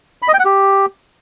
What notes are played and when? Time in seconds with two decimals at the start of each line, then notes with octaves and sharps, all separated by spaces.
0.22 B5
0.28 D#5
0.34 G5
0.39 F#5
0.45 G4